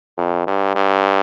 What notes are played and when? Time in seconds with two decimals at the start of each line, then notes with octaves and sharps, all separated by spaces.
0.17 F2
0.47 G2
0.75 G2